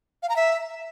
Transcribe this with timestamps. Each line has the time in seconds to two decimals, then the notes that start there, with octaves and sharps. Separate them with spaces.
0.23 F5
0.29 A#5
0.36 E5